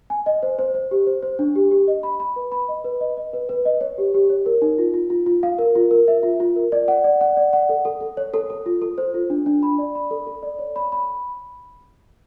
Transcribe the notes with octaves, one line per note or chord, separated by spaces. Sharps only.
G#5
D#5
C5
C5
C5
G4
C5
C5
D4
G4
G4
D#5
B5
B5
B4
B5
D#5
B4
D#5
D#5
B4
B4
D#5
C#5
G4
G4
C#5
A#4
D#4
F4
F4
F4
F4
F5
A#4
F4
A#4
E5
F4
F4
A#4
D5
F#5
D5
F#5
D5
F#5
A4
A4
A4
C#5
A4
A4
F4
A4
C5
F4
D4
D4
B5
D5
B5
A4
A4
D5
C#5
B5
B5